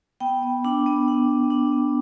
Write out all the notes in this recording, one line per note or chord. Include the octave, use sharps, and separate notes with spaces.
B3 G5
B3
D4
B3
D4
D4
D4
B3